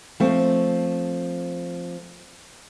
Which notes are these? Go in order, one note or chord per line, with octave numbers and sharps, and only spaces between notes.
F3 A3 C4